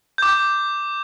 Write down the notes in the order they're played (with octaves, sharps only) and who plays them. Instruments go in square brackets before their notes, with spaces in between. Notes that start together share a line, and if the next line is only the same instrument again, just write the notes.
[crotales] D6 G6